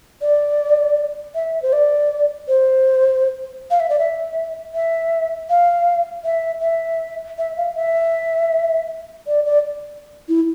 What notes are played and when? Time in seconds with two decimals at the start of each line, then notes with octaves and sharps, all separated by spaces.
0.22 D5
1.35 E5
1.62 C5
1.73 D5
2.48 C5
3.71 F5
3.80 E5
3.90 D5
3.99 E5
4.74 E5
5.50 F5
6.25 E5
6.62 E5
7.38 E5
7.57 F5
7.75 E5
9.27 D5
9.46 D5
10.29 E4